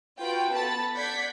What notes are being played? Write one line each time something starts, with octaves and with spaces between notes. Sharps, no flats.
F4 F#4 B4 G5
B3 A4 A5 B5 A6
D5 F#5 G6 G#6 B6